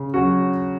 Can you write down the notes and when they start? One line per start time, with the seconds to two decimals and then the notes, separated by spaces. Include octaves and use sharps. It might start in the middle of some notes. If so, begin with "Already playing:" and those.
Already playing: C#3
0.14 F#3 C#4 F#4